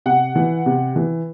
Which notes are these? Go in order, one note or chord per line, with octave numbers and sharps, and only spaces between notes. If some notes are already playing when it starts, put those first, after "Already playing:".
C3 F#5
E3
C3
E3